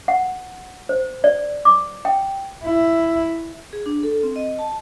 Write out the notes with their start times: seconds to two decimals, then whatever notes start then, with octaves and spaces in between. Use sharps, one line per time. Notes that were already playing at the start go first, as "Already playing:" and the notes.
0.08 F#5
0.89 C5
1.24 D5
1.65 D6
2.05 G5
2.64 E4
3.73 G#4
3.86 D4
4.03 A4
4.23 C4
4.36 D#5
4.59 A5